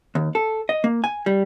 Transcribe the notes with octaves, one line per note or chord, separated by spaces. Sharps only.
D#2
A4
D#5
A#3
G#5
G3